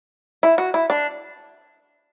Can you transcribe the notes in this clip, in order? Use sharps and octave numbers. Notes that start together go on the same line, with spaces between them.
E4
F#4
E4
D4